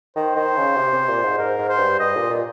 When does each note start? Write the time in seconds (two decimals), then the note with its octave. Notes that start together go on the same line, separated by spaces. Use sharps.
0.16 D#3 C5
0.36 D#3
0.57 C#3
0.77 C3
0.93 C3
1.08 A#2
1.23 G#2
1.38 G#2 A#4
1.58 G#2
1.68 C5
1.79 G2
2.00 G2 D#5
2.16 A#2
2.30 A#2